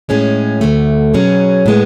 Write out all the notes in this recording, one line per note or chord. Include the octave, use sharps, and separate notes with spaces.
A2 G#3 C#4 G#4
D2 D3 A3
B2 F#3 C#4 G#4
A2 G#3 B3